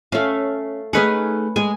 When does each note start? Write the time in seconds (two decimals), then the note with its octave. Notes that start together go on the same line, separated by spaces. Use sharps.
0.12 A3 C#4 F5
0.93 A3 C#4 D#4 G#4 B4 F#5
1.56 G#3 G#5